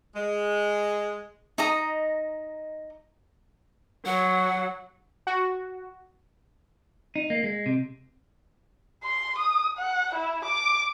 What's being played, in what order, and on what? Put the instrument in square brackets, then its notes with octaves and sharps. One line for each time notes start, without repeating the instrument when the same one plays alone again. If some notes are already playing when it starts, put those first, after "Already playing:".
[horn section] G#3
[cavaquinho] D#4 D#5 A#5
[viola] F#3 [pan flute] F#5
[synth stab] F#4
[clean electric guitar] D#4
A#3
G#3
C3
[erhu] C6
D#6
F#5
E4
D6